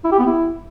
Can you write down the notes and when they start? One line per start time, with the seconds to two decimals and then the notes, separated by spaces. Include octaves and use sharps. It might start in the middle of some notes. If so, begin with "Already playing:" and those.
0.04 E4
0.12 G4
0.19 B3
0.27 E4